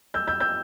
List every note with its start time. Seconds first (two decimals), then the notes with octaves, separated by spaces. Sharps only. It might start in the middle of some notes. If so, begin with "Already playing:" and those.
0.14 E6 G6
0.27 E6 G6
0.40 E6 G6